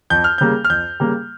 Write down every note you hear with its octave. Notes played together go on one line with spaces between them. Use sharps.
F2 G6
F6
C#3 G3 A#3 G6
F6
F2 G6
C#3 G3 A#3